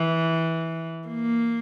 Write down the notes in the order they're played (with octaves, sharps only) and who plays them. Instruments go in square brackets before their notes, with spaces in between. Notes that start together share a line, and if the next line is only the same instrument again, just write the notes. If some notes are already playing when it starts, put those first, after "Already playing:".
Already playing: [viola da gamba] E3
A#3